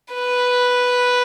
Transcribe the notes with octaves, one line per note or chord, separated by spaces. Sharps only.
B4